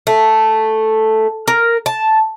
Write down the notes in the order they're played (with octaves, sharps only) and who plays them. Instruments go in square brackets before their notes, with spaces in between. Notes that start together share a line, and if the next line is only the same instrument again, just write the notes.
[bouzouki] A3
A#4
A5